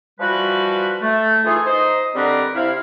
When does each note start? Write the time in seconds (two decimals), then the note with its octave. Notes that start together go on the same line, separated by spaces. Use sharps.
0.20 E3 F3 G3 F#4 B4
1.02 A3
1.44 E3 A3 D#4 F4 G#4
1.66 D#4 C5 D#5
2.15 D3 G3 C4 G4 A#4 B4
2.55 C3 E4 F5